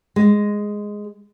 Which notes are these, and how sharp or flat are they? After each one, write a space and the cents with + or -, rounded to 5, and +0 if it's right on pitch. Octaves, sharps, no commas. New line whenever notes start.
G#3 -5